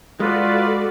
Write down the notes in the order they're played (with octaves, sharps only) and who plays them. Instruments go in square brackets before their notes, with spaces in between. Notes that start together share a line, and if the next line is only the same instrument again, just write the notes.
[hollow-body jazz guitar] G#3 [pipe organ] F4 B4 [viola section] F#4 A4 D5